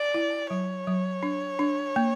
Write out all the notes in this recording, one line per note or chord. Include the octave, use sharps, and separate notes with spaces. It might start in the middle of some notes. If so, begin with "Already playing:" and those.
Already playing: D5
E4
F#3 C#5
F#3
D4
D4
A#3